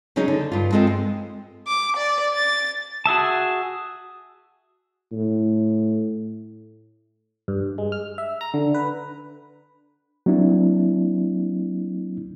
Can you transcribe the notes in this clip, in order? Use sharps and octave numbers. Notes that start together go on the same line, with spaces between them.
C#3 F#3 C#4 D#4 G#4
D3
G2 F4
G#3 C4 F4 A4 D#5 E5
G#3
D6
D5
A6
F#4 G#4 E5 A5
A2
G2
G#3
F6
E5
A#5
D3
B4
F#3 A#3 C4 D4 E4